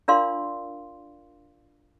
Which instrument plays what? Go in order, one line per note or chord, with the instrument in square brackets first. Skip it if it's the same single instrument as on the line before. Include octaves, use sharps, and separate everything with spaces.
[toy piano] D4 F4 A#4 D5 F5 C6